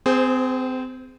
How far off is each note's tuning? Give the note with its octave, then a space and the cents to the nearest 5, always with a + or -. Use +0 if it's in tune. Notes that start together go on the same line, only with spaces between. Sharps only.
C4 -30 G#4 +0 C5 +0